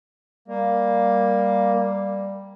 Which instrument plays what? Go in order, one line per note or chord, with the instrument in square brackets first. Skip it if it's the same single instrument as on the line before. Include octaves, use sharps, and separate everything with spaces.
[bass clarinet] G3 [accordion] A#3